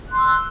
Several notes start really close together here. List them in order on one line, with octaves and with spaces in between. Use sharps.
F#6 C6 E6